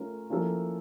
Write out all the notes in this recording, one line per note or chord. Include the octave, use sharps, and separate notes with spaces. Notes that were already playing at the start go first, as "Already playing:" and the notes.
Already playing: A3 C#4 F4 A#4
F3 A#3 C#4 E4 A4